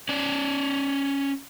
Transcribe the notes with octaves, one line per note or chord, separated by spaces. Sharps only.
C#4 D5